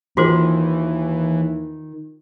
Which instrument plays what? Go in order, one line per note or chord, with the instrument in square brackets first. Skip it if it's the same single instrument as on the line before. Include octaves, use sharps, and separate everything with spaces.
[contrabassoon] D#2 [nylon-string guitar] D#3 [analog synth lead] E3 [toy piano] F4 F#4 C5